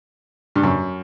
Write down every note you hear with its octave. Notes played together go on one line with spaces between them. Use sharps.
G2
F#2